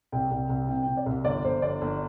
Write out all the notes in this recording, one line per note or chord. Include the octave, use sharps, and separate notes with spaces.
C2 G5
C2
C2
C3 G5
C3 G5
D5
C2
G1 D5
G1 C5
G1 D5
G1